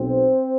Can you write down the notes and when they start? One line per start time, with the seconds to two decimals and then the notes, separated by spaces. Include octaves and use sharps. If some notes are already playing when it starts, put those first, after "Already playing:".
Already playing: B1 B2 C4 C5